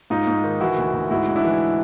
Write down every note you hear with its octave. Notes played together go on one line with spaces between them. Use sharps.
G#2 D#4 F4
G#2
D#3
E3 E4 F#4
D2
D2
G#2 E4 F#4
G#2
D4 E4
E3